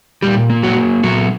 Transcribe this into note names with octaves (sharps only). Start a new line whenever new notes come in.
A#2 G3 G4
A#3
F#3 F#4
F#3
A#2 F#3 F#4